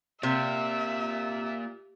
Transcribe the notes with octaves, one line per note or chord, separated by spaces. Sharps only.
C3 A#3 F4 E5